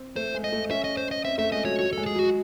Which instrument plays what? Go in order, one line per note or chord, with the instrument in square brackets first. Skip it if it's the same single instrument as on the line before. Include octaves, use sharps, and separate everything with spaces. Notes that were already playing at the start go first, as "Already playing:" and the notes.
Already playing: [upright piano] C4
[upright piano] A3 [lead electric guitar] C5
[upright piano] G#3
[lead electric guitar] D#5
[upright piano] A3
[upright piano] C#4 [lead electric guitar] E5
[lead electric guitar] D#5
C5
D#5
[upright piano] C4 [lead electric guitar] E5
[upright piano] A3 [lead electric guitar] E5
[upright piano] G#3 [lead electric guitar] D#5
[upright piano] F#3 [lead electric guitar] C#5
[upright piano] F#3 [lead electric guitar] C#5
[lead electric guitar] A4
[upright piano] G#3
[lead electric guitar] G#4
[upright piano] F#3
[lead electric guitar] F#4